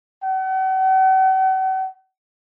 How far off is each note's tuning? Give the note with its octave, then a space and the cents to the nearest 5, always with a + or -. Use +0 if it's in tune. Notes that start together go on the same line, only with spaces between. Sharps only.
F#5 +45